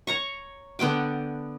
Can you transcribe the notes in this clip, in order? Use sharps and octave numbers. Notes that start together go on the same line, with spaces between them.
C#5 A#5 C#6
D3 B3 G5 D6